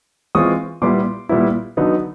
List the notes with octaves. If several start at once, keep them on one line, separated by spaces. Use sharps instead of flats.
E3 G#3 C4 F4 C#6 D#6
A#2 G3 B3 E4 C6 D6
A#2 G3 B3 E4
D3 F#3 B3 D#4